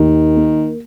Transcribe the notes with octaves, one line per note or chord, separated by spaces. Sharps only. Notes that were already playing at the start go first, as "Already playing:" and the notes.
Already playing: D#2 D#3
A#3